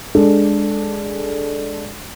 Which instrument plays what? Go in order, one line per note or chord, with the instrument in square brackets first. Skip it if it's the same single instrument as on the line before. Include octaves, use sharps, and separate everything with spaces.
[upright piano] G#3 D4 A4